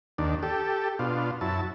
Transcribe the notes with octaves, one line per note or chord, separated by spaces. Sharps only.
D#2 D4
G4 A4
B2 D4 F4
F#2 E4 A5